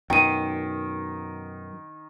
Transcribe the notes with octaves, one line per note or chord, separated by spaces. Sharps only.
F#2 B2 D#3 G5 D#7